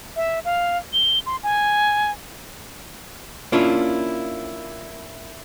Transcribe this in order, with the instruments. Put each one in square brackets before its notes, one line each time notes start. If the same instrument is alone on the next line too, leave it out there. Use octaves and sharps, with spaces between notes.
[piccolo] E5
F5
G7
C6
G#5
[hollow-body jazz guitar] A#3 C#4 D4 E4 F4